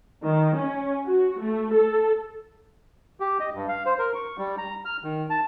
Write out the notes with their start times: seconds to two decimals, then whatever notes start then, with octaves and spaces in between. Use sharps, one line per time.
0.24 D#3
0.56 C#4
1.06 F#4
1.40 A3
1.73 A4
3.20 G4
3.40 D#5
3.54 G2
3.68 F5
3.86 C5
3.99 A#4
4.15 C#6
4.38 G3
4.58 A#5
4.85 F6
5.04 D#3
5.30 A5